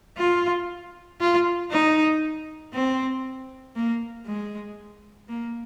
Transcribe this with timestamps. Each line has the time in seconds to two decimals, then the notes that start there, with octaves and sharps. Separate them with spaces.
0.18 F4
1.20 F4
1.71 D#4
2.74 C4
3.76 A#3
4.27 G#3
5.29 A#3